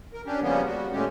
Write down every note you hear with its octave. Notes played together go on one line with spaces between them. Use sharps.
A#4
C#4 D4 G4
C#3 F3 G3 A#3 B3 C#4
G3 F#4
A#2 D#3 G#3 A3 C#4 G4